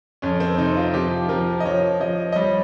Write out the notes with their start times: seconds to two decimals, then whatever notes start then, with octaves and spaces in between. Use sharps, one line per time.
0.22 F2 C#4
0.40 C4
0.58 C3 D#4
0.77 F4
0.94 F3 G4
1.29 F3 A#4
1.60 D#5
1.65 F3 C#5
2.00 F3 D#5
2.32 D#5
2.36 G3 C#5